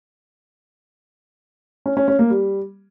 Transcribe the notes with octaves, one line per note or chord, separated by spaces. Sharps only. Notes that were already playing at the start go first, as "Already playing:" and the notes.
C#4
C#4
C#4
A#3
G3